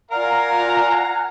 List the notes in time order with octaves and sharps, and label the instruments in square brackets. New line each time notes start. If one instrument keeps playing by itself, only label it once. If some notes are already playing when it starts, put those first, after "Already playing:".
[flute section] F4 D5 [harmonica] A#4 F5 [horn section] F#5 G#5 A#5